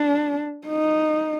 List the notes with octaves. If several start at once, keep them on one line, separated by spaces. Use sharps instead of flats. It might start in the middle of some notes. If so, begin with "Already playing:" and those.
Already playing: D4
D#4